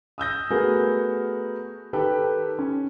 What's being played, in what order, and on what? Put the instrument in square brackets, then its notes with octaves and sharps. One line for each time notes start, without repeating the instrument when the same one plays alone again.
[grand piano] D#6 E6 G6 A#6
A3 B3 F#4 G#4 A#4
D#3 G4 A4 B4 G5
C#4